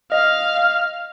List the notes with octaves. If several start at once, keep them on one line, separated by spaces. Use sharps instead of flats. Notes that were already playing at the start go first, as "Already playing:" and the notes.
D#5 F5